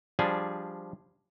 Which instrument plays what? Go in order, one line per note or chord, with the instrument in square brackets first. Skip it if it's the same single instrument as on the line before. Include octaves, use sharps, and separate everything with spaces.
[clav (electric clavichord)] F3 G3 D4 G#4